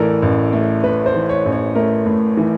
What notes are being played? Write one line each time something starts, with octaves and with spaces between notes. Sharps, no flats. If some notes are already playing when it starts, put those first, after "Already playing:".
Already playing: A1 A2 E3 A3 A4 A#4 D5
A1
A3
A2 B4
C5
E3
C#5
A1
C#5
A3 A#4
A2
E3